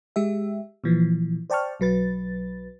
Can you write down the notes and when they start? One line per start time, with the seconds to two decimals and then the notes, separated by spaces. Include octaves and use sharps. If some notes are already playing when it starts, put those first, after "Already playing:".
0.16 G#3 G4 E5
0.84 A#2 E3 F3
1.50 C5 D5 G5 A5 C#6 F6
1.80 B1 F#3 B4 A6